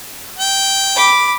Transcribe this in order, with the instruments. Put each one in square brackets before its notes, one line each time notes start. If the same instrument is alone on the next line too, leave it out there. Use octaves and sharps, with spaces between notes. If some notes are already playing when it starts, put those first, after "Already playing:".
[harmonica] G5
[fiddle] B5 D6